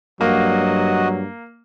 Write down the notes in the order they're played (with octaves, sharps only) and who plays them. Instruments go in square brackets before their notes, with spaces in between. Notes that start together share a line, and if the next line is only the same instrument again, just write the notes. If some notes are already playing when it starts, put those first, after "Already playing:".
[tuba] G2 [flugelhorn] F#3 [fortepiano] A#3 [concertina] F#4 D#5